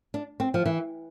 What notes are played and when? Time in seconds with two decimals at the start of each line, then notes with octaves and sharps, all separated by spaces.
0.14 D4
0.40 C4
0.54 F3
0.66 E3